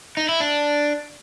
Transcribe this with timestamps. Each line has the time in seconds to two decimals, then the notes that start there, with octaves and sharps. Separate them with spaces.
0.17 D#4
0.29 E4
0.40 D4